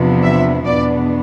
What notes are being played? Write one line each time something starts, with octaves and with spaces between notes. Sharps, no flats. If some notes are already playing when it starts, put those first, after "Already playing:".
Already playing: E2 C3 F3 B3 D4
E5
E2 B2 B3 D4 D5